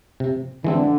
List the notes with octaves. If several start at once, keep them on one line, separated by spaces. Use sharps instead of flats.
C3
D3 E3 G#3 C4